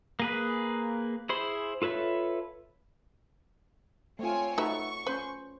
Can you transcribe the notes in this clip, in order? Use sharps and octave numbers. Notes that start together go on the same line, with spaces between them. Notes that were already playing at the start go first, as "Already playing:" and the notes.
A#3 G#4 B4
E4 G#4 C5 B5 C6
F4 A4 B4 C#5 E5
A3 C4 F4 C#5 G#5
A3 D#4 F#4 A4 B4 E5 C#6
C#4 B4 C5